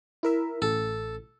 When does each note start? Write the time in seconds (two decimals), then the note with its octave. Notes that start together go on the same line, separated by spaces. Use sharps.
0.23 E4 A#4 E5
0.62 A1 A4